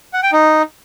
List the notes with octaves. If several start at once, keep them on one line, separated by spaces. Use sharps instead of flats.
F#5
G5
D#4